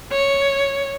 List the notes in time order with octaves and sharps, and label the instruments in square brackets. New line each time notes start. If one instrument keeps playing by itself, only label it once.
[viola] C#5